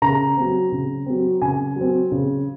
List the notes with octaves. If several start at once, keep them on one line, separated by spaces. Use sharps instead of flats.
C#3 A#5
F#3 C4
C#3
F#3 C4
C#3 G#5
F#3 C4
C#3